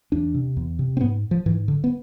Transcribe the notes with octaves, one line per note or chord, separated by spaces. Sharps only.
E2 D4
C3
E2
C3
C4
G#2 B3
F3
G#2 E3
D3
B3